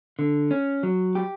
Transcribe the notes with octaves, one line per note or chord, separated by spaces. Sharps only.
D3
C#4
F#3
G4